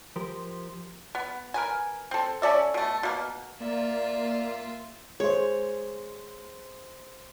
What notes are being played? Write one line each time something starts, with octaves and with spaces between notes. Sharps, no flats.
F3 G4 A#4 C5
B3
A#4 B4 G#5
C4 A4
C#4 A4 D5 E5
B2 A3
B2 A#3
A#3 F4 D5 E5
G#3 C5 C#5